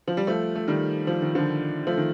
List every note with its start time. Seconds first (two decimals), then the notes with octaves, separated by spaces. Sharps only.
0.07 F3
0.17 G3
0.27 F3 A3
0.56 A3
0.68 D#3 G3
1.07 F3
1.22 D#3
1.35 D3 F3
1.87 F3 A3
1.97 D#3